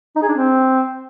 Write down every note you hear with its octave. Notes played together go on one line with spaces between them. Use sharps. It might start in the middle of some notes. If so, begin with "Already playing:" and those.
D#4
G#4
D4
C4